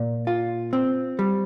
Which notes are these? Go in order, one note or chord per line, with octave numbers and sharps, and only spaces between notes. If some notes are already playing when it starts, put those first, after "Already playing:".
Already playing: A#2
F4
C4
G3